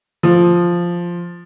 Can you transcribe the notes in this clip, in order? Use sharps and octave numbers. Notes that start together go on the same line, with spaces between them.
F3